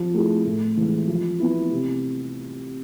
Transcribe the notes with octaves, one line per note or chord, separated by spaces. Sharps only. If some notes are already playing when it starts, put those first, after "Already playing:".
Already playing: F3
A3 E4 G#4
A2
E3 G#3
F3
B3 E4
C3